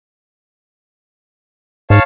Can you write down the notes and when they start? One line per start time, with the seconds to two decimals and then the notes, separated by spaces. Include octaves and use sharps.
1.90 G#2 C#5 F5 A5